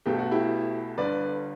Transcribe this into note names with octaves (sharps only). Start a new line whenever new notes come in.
B1 B2 A3 G4
F#4
E4 G4
G1 G2 D3 B4 D5